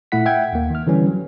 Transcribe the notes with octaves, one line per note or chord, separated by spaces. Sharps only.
A#2 A3 E4 F#5 B6
E5 F#5 G5 G#6
D#2 A#3
D#3 F6
D3 E3 G3 C#4
F#3